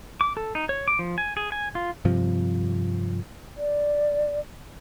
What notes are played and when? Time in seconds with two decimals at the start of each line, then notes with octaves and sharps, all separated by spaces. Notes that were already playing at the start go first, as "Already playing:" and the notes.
0.21 D6
0.37 A4
0.55 D#4
0.69 C#5
0.88 D6
0.99 F3
1.18 G#5
1.37 G#4
1.52 G#5
1.75 F4
2.05 G2 C3 F3
3.57 D5